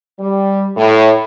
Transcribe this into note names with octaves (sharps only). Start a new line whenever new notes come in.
G3
A2